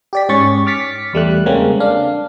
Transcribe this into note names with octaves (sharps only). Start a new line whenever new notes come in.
G4 D5 B6
G#2 C#4 C#5 C#6 A6
D6 F6 A6 B6 C#7
E2 G3 A3 F#6
C#3 G3 G#3 A#3 C4 C#4
D4 F5